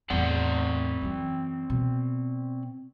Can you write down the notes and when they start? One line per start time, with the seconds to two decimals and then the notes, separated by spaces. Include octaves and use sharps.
0.10 E2 A2 C4 D5 F#5
1.01 F#2 E3
1.70 B2